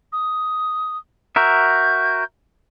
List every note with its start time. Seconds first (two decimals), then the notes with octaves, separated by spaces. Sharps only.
0.13 D#6
1.36 F#4 A#4 E5 G6